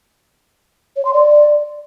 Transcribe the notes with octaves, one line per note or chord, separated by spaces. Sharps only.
C#5
C6
D5